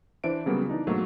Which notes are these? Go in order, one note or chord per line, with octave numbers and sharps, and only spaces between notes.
E3 D4 C5 E5 D7
C#3 F#3 G3 A#3 B3
E3 D4 D#4
G#2 B2 F#3 A3 A#3